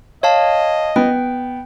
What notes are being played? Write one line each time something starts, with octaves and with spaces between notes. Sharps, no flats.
C#5 D#5 F5 A5
B3 G5